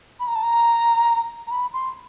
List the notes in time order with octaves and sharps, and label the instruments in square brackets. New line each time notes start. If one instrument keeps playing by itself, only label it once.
[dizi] B5
A#5
A5
A#5
A#5
B5
C6